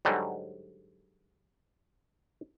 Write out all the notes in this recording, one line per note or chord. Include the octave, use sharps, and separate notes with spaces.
G#2 D3 F#3 G3